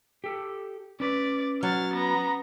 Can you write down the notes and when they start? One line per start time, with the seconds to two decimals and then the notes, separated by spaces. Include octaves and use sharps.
0.24 G4 A4
1.00 C#4 B4 D5
1.63 F#3 F6 A6
1.93 B3 A#5